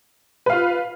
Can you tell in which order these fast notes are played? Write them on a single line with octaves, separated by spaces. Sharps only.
B4 F5 F4